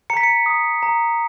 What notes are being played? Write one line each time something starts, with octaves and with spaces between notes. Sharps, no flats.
A#5 C#7
B6
C#7
D#6
A#5